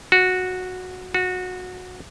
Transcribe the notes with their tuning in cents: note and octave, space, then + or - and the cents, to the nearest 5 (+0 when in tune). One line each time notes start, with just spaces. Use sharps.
F#4 -10
F#4 -20